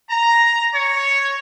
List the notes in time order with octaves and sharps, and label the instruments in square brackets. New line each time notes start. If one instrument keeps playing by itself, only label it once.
[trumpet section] A#5
C#5